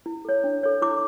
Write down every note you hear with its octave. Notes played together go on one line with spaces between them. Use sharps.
E4
A4 C#5
D4
A4 C#5
E4 D6